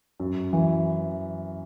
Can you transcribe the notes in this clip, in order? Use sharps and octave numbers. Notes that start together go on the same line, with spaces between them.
F#2
E3